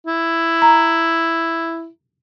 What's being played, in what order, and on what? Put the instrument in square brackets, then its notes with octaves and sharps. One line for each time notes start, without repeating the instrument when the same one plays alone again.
[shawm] E4
[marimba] A#5